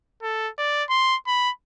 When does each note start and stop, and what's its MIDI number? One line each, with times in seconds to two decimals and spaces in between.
0.23 0.49 69
0.58 0.84 74
0.89 1.16 84
1.27 1.50 83